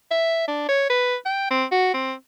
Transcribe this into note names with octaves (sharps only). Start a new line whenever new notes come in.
E5
D4
C#5
B4
G5
C4
F#4
C4